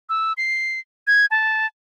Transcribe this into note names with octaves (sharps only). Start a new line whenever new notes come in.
E6
C7
G#6
A5